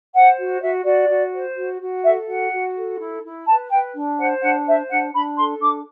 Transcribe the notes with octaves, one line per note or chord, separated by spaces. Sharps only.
C5 F#5
F#4
F#4 E5
F#4 D5
F#4
C5
F#4
F#4
A4 E5
F#4 F#5
F#4
A4
E4
E4
B4 A5
B4 G5
D4
C5 F#5
D4 F#5
C5 E5
D4 F#5
D4 B5
A4 C6
D4 D6